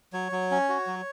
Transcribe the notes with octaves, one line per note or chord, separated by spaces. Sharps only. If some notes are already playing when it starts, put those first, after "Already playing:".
F#3 C#5
F#3
C#4
F#4
F#3